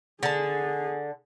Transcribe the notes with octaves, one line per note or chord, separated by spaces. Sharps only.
D3 G#4 A5